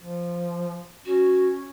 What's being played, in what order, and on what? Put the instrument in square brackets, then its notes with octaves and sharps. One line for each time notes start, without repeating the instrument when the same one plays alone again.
[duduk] F3
[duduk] C#4 [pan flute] F#4